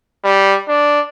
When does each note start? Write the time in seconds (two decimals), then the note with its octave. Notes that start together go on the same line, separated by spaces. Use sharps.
0.24 G3
0.68 D4